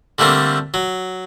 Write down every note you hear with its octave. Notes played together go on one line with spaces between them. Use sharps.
D3 G3 A3 A#3 C4
F#3